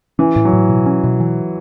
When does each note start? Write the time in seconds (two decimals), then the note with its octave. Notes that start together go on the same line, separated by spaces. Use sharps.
0.19 E3 C#4
0.36 A2
0.45 F#3
0.53 A2
0.70 B2
0.86 C#4
1.04 B2
1.20 E3